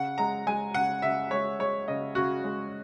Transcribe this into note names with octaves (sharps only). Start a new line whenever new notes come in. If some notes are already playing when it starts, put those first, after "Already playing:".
Already playing: C#3 F#5
G#3 A#5
G#3 G#5
C#3 F#5
C#3 E5
G#3 C#5
G#3 C#5
C#3 D#5
C#3 F#4
G#3